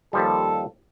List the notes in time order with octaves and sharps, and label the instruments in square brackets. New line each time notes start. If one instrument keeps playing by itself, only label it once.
[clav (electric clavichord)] D#2 F3 G3 [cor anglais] A4